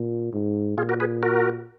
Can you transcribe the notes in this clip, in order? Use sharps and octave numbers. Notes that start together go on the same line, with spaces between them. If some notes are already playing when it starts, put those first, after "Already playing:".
Already playing: A#2
G#2
A#2 F4 G#4
F#4 A#4
G#4 B4
F#4 A#4